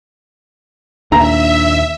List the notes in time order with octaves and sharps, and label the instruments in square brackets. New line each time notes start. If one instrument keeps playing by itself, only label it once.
[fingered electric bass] D#2 A#2 [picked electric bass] D4 [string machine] E5 [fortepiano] A#5